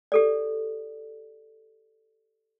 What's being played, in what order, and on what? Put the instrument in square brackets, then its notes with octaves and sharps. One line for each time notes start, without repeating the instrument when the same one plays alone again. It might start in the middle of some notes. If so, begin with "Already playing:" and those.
[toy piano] G4 A4 D5